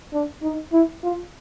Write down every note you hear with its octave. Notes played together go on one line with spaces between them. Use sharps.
D4
D#4
E4
F4